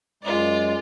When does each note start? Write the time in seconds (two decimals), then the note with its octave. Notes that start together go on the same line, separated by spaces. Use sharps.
0.23 F#2 G#3 F4 D5